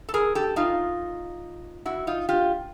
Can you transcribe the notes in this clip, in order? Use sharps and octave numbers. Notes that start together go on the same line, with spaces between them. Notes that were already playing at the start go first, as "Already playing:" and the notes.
A4
G#4 A#4
G4 A4
D#4 F4
E4 F#4
D#4 F4
F4 G4